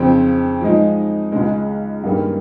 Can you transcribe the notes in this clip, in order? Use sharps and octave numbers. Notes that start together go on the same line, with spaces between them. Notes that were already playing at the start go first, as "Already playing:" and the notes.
Already playing: F2 C#3 F3 C4
F3 G#3 D#4
C#2 C#3 G#3
G2 D#3 G3 A#3 C#4